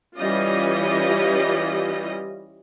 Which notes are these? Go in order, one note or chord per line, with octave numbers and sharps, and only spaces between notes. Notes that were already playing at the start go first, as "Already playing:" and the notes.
E3 G3 C#4 F4 D#5